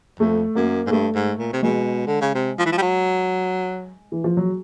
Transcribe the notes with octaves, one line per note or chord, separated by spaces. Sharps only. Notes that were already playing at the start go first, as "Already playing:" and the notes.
F2 A3
F#2 A#3
G#2
G2 A3
G#2
A#2
C3
B2 G#3
D3
C#3
C3
F3
E3
F3
G3
F#3
E3
F3
F#3